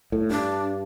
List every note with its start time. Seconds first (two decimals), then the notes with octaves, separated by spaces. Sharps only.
0.12 A2
0.30 G2 D4